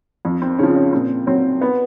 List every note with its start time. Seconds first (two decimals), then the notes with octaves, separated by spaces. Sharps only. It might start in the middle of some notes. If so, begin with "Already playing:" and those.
0.25 F2
0.42 C4
0.59 C#3 F3 C#4
0.76 C#4
0.93 A#2 C4
1.27 F#3 C4
1.61 B3